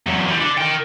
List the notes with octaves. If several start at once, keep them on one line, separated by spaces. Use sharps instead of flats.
E2 F#3
E3 G3
D3
A#4 G5